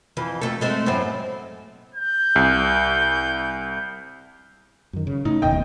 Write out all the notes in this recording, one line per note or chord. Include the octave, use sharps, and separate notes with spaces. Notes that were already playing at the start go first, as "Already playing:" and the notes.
F2 E3
F2 A3 A4
G#3 A3 C4
F#2 A2 C4
G6
C2
F#2 D#3
C#3
A2 C#3 D#4
F1 D#2 B2 D#5 G5